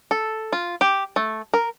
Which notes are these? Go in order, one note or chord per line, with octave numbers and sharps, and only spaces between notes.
A4
F4
G4
A3
A#4